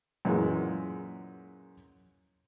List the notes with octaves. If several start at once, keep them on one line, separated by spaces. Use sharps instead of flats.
F#2 A#2 E3 G#3